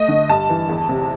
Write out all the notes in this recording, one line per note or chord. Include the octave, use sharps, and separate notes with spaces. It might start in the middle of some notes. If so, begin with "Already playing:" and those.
Already playing: A3 D#5
D3
G2 A5
E3
E2
C3